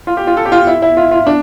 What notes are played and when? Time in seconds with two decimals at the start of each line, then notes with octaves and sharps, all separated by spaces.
0.07 F4
0.17 G4
0.27 F4
0.37 A4
0.46 G4
0.52 F4
0.67 E4
0.82 E4
0.97 F4
1.11 F4
1.26 D4